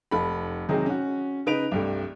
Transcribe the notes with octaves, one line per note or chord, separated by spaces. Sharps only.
F1 A4 B5
C3 D#3 F#3 G#3 D#4 G#4
C#4 F#4
C#3 D#4 B4 D7 F7
C2 G2 A3